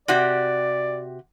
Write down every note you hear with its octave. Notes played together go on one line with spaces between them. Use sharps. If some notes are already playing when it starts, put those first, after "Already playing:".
C3 F#4 G4 D5